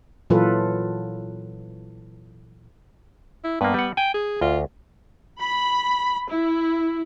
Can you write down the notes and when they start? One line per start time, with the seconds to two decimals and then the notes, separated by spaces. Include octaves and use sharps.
0.30 A#2 E3 F#3 F4 A4 B4
3.44 E4
3.61 G2 A#3 B3
3.74 G3 F#5
3.97 G5 G#5
4.14 G#4
4.41 D2 F4
5.38 B5
6.29 E4